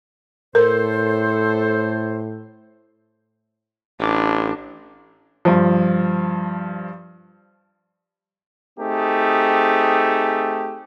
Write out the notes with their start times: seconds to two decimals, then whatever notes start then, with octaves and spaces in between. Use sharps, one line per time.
0.55 A2 A4 A#4 C5
3.99 A1 D4
5.45 G2 F3
8.79 A3 C4 D#4 G4 G#4